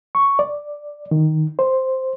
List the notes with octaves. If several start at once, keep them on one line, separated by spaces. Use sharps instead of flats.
C#6
D5
D#3
C5